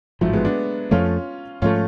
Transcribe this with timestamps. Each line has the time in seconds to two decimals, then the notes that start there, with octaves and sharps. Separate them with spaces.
0.21 A1 G#2 F3 F#3 A3
0.33 G#3 B3
0.45 B3 D4
0.91 F2 F3 A3 C#4 F4
1.62 G#2 F3 A3 C#4 F4